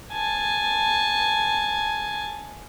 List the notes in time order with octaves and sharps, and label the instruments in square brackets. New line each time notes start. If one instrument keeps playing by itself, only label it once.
[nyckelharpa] G#5 A5